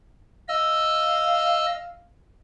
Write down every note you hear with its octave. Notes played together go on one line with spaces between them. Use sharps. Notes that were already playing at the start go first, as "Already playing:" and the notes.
D#5 F5 E6